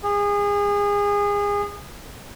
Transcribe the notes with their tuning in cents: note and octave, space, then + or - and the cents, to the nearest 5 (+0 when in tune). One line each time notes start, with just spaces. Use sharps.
G#4 -30